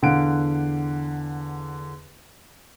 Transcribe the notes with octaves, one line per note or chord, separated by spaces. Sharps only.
E2 D3 F5 F#5 F#6 D7